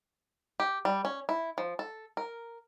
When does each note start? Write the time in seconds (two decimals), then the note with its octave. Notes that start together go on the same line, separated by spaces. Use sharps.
0.60 G4
0.85 G3
1.05 C#4
1.29 E4
1.58 F3
1.79 A4
2.17 A#4